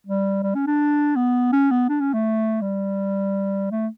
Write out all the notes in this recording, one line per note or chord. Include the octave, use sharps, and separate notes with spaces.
G3
G3
C#4
D4
B3
C#4
B3
D4
C#4
A3
G3
A3